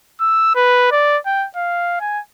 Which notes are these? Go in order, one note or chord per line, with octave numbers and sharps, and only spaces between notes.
E6
B4
D5
G5
F5
G#5